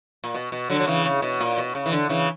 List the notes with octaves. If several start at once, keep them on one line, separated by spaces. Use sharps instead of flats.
A#2
B2
B2
D3 F#3
F#3
C#3 E3
C#3
B2
A#2
B2
C#3
E3
D3
C#3 E3